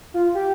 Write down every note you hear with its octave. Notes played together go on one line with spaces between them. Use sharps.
F4
G4